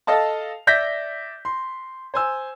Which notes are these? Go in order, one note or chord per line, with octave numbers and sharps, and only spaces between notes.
A4 D#5 F5 A5
D5 E5 G6 A#6 B6
C6
C5 G#5 E6